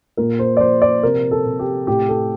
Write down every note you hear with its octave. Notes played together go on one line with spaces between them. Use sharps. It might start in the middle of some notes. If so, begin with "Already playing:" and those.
A#2 A#4
C5
D5
F3 C5
D5
C3 A#4
A4
C3
G4
A2 G4
A4